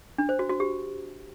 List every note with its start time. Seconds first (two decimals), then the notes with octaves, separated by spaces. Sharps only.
0.18 D4
0.29 C5
0.39 F#4
0.50 F#4
0.60 G4